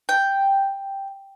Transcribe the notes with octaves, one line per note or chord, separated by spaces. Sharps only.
G5